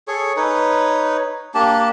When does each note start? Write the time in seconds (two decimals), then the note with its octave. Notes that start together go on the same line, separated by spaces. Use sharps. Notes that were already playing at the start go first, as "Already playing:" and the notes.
0.08 G#4 A4 C#5 C#6
0.37 D#4 B4 C#5
1.54 A#3 D4 G4 A5